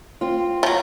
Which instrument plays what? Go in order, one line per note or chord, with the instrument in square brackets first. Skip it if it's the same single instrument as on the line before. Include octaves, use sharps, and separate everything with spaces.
[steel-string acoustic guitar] C4 F4
[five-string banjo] F3 F#3